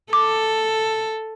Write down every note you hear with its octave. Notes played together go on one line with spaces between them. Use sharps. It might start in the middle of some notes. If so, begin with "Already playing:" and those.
A4 D6